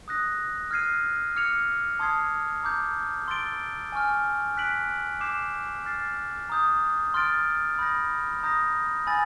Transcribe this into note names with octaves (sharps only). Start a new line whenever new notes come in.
D#6 F#6 A#6
F6 G#6 C7 D#7
D6 F6 G#6 C#7 F7
A5 C6 D#6 G#6 C7
A#5 D6 G6
C6 E6 A6 D7 G7
G#5 C#6 F6
F#6 B6 D7 F#7
D6 G6 C7 E7
F6 A6 C7
A#5 D#6 G6
C6 F6 A6 D7
B5 D#6 G6 A#6
A#5 D#6 G6 A#6
G#5 B5 E6 A6